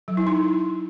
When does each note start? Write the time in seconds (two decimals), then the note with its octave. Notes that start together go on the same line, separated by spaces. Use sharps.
0.08 F#3
0.17 E4
0.27 D#4